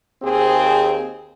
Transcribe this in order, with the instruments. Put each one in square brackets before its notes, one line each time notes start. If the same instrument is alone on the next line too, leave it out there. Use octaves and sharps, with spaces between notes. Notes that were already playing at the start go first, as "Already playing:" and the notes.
[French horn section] D#2 C4 G#4